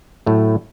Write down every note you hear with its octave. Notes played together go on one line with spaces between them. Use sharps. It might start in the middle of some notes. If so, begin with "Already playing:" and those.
A2 F#3 A3